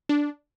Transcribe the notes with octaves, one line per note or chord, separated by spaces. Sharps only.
D4